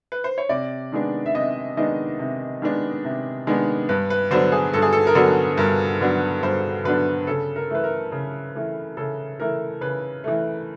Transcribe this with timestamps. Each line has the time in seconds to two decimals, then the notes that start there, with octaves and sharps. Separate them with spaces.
0.12 B4
0.24 C5
0.38 C#5
0.49 C3 D5
0.92 D#3 G#3 B3 D4
1.26 E5
1.34 C3 D#5
1.77 D#3 G#3 B3 D4 D#5
2.19 C3
2.62 D#3 G#3 B3 D4
3.05 C3
3.47 D#3 G#3 B3 D4
3.89 G2 B4
4.10 B4
4.31 D3 F#3 B3 D4 C5
4.52 G#4
4.73 G2 A4
4.82 G#4
4.93 A4
5.07 A#4
5.15 D3 F#3 B3 D4 A4
5.58 G2 A#4
6.01 D3 F#3 B3 D4
6.43 G2 C5
6.85 D3 F#3 B3 D4 B4
7.27 C#3 A4
7.56 A#4
7.70 E3 A3 B4
7.84 A#4
8.12 C#3
8.55 E3 A3
8.97 C#3 A4
9.39 E3 A3 A#4
9.81 C#3 B4
10.24 E3 A3